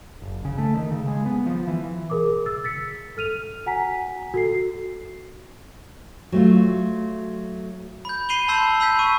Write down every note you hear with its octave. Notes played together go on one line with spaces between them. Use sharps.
F#1
C#3
A3
D#3
C#3
G#3
B3
F3
E3
G#4 A#4 D6
E6 A6
A6 B6 C#7
A4 F6 D#7 F7
F#4 F#5 G#5 A#5 B6
F#4 A4 C7
F#3 A3 F4
B5 G6
B5 C7 D#7 F7 G7
A5 B5 C6 E6 G6 C7
B5 E6 G6 B6
C#6 D#7